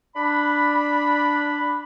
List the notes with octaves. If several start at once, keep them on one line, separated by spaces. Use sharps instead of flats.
D4 B5